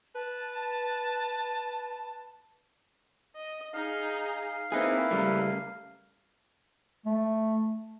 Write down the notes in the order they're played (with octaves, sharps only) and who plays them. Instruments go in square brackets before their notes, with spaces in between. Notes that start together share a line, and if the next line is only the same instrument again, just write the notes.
[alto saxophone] B4 [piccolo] A5
[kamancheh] D#5
[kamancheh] D#4 G#4 [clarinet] F5
[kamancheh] A#3 [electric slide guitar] C4 D#4 G#4 [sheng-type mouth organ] E4 B4
[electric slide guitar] C#3 G3 A3
[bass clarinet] A3